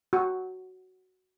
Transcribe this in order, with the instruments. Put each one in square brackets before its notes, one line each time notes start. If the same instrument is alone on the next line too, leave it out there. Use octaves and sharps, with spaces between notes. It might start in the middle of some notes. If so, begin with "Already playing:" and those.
[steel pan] F#4